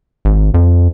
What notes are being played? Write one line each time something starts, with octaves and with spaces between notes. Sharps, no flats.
G#1
F2